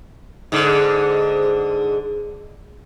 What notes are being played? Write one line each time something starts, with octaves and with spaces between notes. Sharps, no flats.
G#2 D3